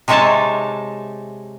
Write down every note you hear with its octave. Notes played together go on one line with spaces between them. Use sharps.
C3 G#3 D#4 C#5 E5 A5